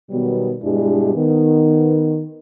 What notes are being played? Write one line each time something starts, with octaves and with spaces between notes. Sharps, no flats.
B2 D#3 F#3 G3 B3
G2 B2 G#3 D4 E4 G4
D#3 B3